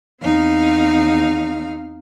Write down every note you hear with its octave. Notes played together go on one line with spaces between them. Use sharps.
E2 C4 D#4 F5